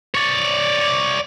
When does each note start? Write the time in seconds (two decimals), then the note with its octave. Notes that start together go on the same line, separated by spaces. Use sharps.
0.15 C#5 D5